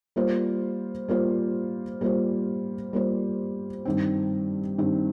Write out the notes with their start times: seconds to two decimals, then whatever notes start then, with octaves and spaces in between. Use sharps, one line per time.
0.16 G3 A#3 F4 C5
1.08 G3 A#3 F4 C5
2.01 G3 A#3 F4 C5
2.93 G3 A#3 F4 C5
3.85 G2 D#3 C4
4.78 G2 D#3 C4